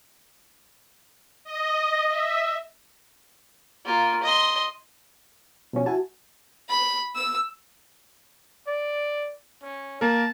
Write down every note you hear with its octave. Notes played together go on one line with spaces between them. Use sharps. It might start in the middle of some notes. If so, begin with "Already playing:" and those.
D#5
E5
A#3 F4
D#5 C6
B2 F3 C#4
E4 F#4 G#5 A5
B5
E6
D5
C#4
A#3 A#4 A5